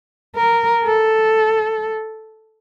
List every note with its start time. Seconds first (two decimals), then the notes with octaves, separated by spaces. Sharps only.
0.35 A#4
0.85 A4